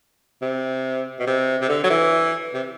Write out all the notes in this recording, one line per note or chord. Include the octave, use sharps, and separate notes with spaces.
C3
B2
C3
C3
D3
F#3
E3
C3